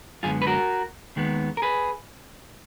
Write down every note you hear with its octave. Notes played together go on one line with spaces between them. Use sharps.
F#2 D3 G#3 B3 F4 G#4
B4
F#4 A#4
D#2 D#3 G#3 B3
A#4
G#4 B4